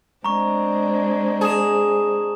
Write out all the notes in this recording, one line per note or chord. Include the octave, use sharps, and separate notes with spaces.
G#3 C4 D4 A#5 C#6
G#4 A5 E7